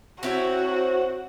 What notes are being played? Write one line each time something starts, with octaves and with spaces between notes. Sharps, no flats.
C4 E4 F#4 C#5